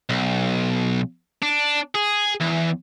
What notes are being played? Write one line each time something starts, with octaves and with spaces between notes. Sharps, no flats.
B1
D4
G#4
E2